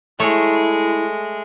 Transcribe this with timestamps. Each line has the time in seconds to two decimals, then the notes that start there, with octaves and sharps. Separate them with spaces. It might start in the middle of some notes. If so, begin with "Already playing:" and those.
0.20 G#3 A3 E4 C#5